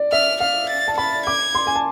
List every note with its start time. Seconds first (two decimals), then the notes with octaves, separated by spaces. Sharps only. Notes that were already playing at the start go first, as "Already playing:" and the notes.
Already playing: D5
0.12 E5 F6
0.40 F5 F6
0.70 A6
0.88 A5
0.98 B5 A6
1.26 D6 G#6
1.55 C6
1.67 G#5
1.76 A5